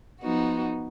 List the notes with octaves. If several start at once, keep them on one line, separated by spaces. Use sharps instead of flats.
F3 B3 D#4 F#4